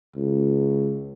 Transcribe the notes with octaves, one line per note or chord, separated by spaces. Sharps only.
C#2